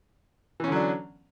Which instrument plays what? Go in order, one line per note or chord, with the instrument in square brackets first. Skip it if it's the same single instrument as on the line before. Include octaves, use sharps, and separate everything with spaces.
[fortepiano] E3
C#4
D3
F#3
D4